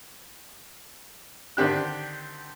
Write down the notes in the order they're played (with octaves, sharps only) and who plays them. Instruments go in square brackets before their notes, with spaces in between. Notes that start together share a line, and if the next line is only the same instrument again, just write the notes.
[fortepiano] D3 D#3 C4 G4 F#6